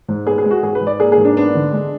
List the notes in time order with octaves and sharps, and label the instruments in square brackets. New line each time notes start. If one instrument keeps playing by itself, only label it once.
[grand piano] G#2
B3 G#4
G#4
G#3
F#4
G#2 G#4
B4
G#2
D5
A#3 G#4
G#4
G#2
D4
B3 D4
D3
G#3